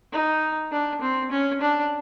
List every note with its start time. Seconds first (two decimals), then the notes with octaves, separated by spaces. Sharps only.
0.13 D#4
0.72 D4
1.01 C4
1.31 C#4
1.61 D4